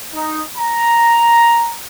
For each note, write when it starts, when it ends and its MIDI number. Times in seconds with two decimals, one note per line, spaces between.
0.14 0.41 63
0.57 1.75 82